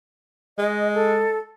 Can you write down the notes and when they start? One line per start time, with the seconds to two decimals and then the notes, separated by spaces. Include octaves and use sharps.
0.59 G#3 D#5
0.94 A4